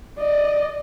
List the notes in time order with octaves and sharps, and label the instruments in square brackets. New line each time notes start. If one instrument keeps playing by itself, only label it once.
[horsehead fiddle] D5 D#5